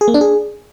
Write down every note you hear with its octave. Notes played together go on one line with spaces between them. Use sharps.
G#4
A#3
D4
G#4